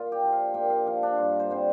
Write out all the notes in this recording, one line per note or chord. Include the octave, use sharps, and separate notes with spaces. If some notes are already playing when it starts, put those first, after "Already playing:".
Already playing: A#2 F4
G4
F3 D4
F5
A#2 G5
F5
F3 D4 F5
D4
G2 F4
C5
D3 G3 C4 C5